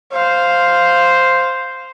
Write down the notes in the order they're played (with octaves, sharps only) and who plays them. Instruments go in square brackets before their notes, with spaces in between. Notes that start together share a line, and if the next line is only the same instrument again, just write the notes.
[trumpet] C5 [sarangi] F5